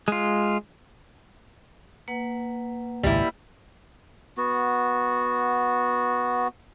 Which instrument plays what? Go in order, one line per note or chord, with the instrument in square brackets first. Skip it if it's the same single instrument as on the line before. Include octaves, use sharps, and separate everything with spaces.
[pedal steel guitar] G#3 F4
[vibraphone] A#3 B4 F#5
[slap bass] G#1 C#2 A#2 [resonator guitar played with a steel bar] G3 E4
[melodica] B3 F#4